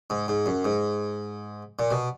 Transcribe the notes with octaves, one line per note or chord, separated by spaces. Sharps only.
G#2
G#2
F#2
G#2
A#2
B2